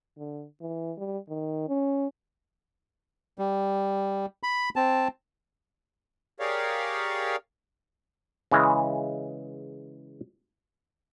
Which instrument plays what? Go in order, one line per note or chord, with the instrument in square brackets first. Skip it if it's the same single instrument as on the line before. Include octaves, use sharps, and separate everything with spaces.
[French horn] D3
E3
G3
D#3
C#4
[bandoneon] G3
B5
C4 A5
[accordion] G4 G#4 A#4 C#5 D5 F5
[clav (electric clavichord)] C#3 E3 G#3